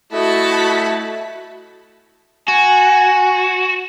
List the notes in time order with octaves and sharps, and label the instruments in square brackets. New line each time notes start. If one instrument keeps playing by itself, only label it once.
[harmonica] A3 E4 D#5 [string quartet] F#4 A5 B5
[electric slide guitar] F#4 [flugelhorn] G#5